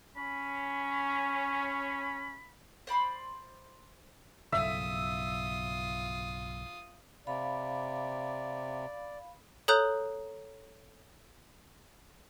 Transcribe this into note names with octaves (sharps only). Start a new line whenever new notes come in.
C#4 B5
C5 D5 B5 C6
B1 G2 C#3 F4 E5 D#6
C3 D5 F5 B5
A4 C#5 A#5 D#6 F#6 G6